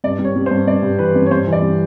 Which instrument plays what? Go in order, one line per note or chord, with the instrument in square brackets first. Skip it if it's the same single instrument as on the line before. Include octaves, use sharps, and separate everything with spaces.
[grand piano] G2 D5
G3
C#5
G3
C5
G2
G2 D5
G2
E3 B4
G2
C#5
G2 C5
E3
D5
G3